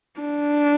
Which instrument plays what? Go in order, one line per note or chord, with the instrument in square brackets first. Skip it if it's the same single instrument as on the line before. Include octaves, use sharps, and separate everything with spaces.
[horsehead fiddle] D4